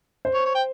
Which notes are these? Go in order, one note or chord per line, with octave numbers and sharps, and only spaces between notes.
C5
C#5
C#5
G5